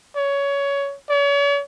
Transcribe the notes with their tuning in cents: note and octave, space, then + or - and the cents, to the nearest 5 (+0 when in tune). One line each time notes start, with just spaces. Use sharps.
C#5 +20
C#5 +40